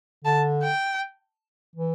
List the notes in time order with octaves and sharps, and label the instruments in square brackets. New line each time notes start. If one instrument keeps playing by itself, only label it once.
[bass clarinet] D3 [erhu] A5
[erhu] G5
[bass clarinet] E3